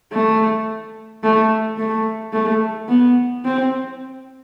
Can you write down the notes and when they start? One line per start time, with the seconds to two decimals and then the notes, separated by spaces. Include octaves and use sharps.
0.13 A3
1.23 A3
1.78 A3
2.33 A3
2.89 B3
3.45 C4